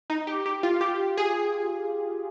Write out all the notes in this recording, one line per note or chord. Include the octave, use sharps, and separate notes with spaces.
D#4
G4
G4
F4
G4
G#4